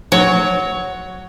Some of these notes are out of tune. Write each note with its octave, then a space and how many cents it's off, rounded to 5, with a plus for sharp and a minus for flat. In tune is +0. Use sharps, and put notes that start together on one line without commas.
F#3 +0 C#5 +15